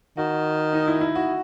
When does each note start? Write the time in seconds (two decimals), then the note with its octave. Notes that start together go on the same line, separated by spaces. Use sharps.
0.17 D#3 F#4
0.73 D#4
0.88 E4
1.01 E4
1.15 F#4